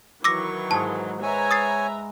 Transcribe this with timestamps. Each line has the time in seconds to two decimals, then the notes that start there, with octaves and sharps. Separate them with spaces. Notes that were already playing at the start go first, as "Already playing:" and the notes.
0.24 D#3 E3 F#3 C#6 D6 E6 A#6
0.71 G#2 G#4 A5
1.23 B4 C#5 E5 G#5 A#5
1.51 D#6 A6 C7